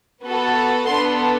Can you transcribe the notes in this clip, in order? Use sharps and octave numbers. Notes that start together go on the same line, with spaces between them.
B3 F#4 A4
B3 D4 A4 C6